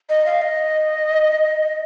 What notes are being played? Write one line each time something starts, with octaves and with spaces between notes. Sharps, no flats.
D#5
F5
D#5